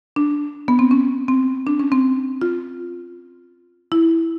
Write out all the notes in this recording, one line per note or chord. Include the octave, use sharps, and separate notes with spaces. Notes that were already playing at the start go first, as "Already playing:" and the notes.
D4
B3
C4
C#4
C4
D4
C#4
C4
F4
E4